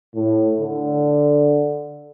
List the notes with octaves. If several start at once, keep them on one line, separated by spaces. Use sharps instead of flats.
A2
D3